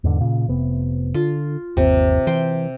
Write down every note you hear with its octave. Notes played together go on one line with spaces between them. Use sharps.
E2 G#2 D3
A#2 C#3
F1 C3 B3
D3 F4
G1 D#2 C3
E3 G5 C6